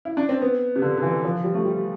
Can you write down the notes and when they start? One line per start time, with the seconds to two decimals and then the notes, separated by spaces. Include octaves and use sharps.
0.05 E4
0.17 D4
0.29 C4
0.42 B3
0.76 C3
0.82 D3
0.97 D3
1.02 E3
1.24 F3
1.44 G3
1.54 A3
1.65 G3